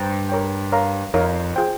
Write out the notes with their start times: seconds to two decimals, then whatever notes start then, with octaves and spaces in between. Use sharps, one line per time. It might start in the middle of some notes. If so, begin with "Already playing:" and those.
Already playing: G2 C5 G5 A#5
0.29 A#4 C#5 G5
0.72 A#4 C#5 F5 A#5
1.14 F2 D#4 A#4 C#5 F5
1.56 F4 G#4 C5 G5